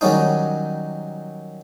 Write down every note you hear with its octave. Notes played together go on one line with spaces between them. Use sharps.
D#3 F#3 G3 C#4 D#4